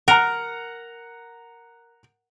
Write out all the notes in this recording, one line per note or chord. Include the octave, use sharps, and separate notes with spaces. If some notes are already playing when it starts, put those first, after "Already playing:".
A#4 F#5 A#5